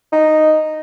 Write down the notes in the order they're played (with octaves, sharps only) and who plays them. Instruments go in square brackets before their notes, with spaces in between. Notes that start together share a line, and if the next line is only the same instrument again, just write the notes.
[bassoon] D#4